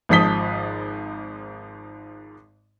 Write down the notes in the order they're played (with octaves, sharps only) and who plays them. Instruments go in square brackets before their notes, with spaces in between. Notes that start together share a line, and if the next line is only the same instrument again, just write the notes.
[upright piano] G#1 G#2 F3 D#6 B6 G7